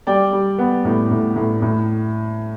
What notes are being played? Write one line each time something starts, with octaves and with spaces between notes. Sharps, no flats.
G3 D5 G5
G3
B3
A2
A2
A2
A2